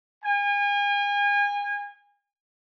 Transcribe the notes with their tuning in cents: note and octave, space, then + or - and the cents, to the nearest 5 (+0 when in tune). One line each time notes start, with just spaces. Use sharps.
G#5 -35